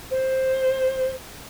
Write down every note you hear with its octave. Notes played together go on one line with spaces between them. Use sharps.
C5